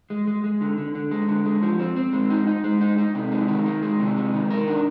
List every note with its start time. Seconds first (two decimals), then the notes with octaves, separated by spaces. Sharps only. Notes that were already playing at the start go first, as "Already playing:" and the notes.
0.10 G#3
0.27 G#3
0.44 G#3
0.61 D3
0.78 D3
0.95 D3
1.11 G#3
1.28 D3
1.46 G#3
1.62 F3
1.80 C4
1.96 C4
2.13 G#3
2.30 D#4
2.47 D#4
2.64 G#3
2.81 D#4
2.98 D#4
3.15 C3
3.32 G#3
3.48 D#3
3.66 G#3
3.83 G#3
4.00 C3
4.16 G#3
4.33 D#3
4.50 A#4
4.67 D4